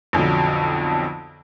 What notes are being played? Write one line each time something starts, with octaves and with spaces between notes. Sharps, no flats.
B1 F2 D3 F#3